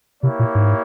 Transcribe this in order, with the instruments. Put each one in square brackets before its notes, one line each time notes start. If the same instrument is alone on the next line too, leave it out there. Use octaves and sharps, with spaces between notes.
[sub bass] C3 [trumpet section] A#3 E4 G4 C#5
[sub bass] A#2
G#2